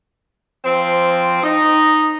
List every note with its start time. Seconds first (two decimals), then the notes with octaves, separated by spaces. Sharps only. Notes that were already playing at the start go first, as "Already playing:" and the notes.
0.63 F3 C4
1.43 D#4